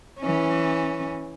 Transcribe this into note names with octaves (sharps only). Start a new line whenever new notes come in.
E3 C#4